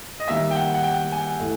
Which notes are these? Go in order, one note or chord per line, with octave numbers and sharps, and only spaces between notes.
D#5
D#3 G3 A#3 E5
G5
F#5
F#5
G5
G#5
A2 E3 A3